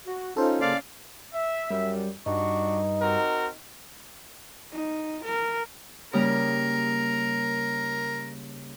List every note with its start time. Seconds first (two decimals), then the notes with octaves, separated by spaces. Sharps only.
0.07 F#4
0.37 C#4 D#4 F4 A4 C5
0.61 C#3 A#3 D5 F5
1.35 E5
1.70 F#2 G3
2.26 G2 D4 D#4 F#4 C#6
3.01 C4 F#4 A#4
4.72 D#4
5.24 A#4
6.13 C#3 G3 A#3 A#4